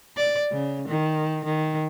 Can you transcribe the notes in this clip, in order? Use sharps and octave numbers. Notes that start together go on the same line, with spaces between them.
D5
C#3
D#3
D#3